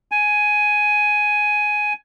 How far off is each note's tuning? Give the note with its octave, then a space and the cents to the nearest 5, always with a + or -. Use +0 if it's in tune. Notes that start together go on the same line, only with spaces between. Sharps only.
G#5 +10